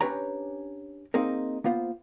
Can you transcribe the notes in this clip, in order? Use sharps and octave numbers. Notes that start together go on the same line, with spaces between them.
C#4 D4 G4 B4 C#5 A#5
A#3 C4 D#4 G#4 A#4
A#3 B3 F4 C5